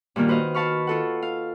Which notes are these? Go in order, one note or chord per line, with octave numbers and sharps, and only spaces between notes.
G2 A#2 D#3 A#3 F4
F#4 B4 C5 D#5 F5
F5 A5 B5 C#6 F6
F4 A4 F#5
F5